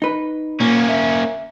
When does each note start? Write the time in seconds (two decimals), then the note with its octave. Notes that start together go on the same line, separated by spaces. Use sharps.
0.02 D#4 B4
0.60 A#2 A#3 C#4
0.89 E5